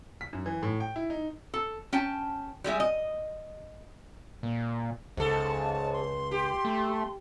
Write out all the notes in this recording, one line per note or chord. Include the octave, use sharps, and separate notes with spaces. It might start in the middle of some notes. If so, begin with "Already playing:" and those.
B6
F#2
E3
A2
G5
E4
D#4
A4
C#4 G5 A5
G3 G#3 G#4 E5
D#5
A#2
C#2 G#2 A4 A5
C6
G4
A3